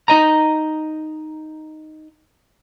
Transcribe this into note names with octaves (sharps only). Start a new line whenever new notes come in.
D#4 D#5 A#5